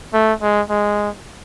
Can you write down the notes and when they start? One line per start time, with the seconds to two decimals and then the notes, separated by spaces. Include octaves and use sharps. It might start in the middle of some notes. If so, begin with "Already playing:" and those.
0.14 A3
0.42 G#3
0.70 G#3